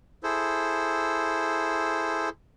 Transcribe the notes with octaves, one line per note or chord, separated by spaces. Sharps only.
E4 G#4 A4 C5